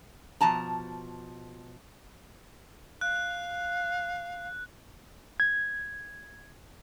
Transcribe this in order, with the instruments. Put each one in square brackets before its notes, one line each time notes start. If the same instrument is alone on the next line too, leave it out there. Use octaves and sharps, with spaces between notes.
[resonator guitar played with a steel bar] B2 F3 A5 A#5
[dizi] F5 [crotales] F#6
[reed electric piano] G#6